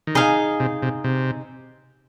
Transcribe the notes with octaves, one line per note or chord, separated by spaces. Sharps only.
D#3
C3 D#4 G#4 F5 G#5
C3
C3
C3